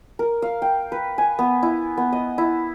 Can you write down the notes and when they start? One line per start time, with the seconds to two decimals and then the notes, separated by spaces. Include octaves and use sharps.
0.19 A#4
0.42 F5
0.62 G5
0.92 B4
1.18 G#5
1.39 B3
1.63 E4
1.97 B3
2.13 D#5
2.38 E4